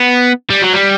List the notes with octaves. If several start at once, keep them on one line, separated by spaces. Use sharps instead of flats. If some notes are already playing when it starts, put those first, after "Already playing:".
Already playing: B3
G3
F#3
G3